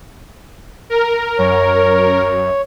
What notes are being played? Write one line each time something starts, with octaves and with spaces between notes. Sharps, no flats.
A#4
F#2 C#5